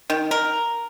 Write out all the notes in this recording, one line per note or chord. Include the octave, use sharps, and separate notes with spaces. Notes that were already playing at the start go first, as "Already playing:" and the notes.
D#3
A#4